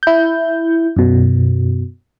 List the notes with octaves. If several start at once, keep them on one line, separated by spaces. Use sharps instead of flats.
E4 G6
F#2 B2